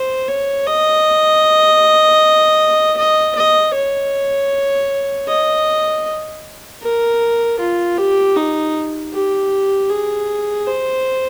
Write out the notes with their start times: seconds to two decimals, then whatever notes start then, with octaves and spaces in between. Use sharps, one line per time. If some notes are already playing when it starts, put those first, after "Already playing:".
Already playing: C5
0.28 C#5
0.67 D#5
2.97 D#5
3.35 D#5
3.74 C#5
5.28 D#5
6.82 A#4
7.59 F4
7.97 G4
8.36 D#4
9.13 G4
9.89 G#4
10.67 C5